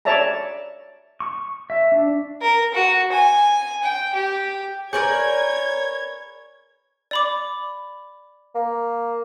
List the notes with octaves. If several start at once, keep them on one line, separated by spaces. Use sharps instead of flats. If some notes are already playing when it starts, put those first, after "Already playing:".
C#5 D5 E5 A5 A#5
C#6
E5
D4
A#4
F#4
G#5
G5
G4
G#4 A#4 B4 C#5 D5 G#5 G6 G#6
D5 B5 D6
A#3